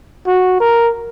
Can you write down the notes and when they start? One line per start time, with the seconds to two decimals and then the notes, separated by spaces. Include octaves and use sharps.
0.27 F#4
0.60 A#4